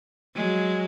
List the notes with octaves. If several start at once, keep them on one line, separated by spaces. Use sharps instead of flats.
F#3 G#3